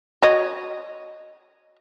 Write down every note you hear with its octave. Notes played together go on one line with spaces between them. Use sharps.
F#4 C#5 D#5